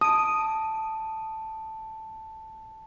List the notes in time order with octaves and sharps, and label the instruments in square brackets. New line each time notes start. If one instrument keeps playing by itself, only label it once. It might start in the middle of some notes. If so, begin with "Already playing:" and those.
[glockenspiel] A5 D7 [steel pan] D#6